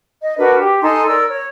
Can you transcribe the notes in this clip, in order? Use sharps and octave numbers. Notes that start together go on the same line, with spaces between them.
D#5
D4 F#4 A#4 B4
G4
D#4 A4 G#5 C6
A#4 D5 E6
C#5